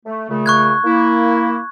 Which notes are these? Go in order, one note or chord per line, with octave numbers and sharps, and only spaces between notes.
A3
A#2 C#3 A3
C#6 F#6 G#6
A#3 E4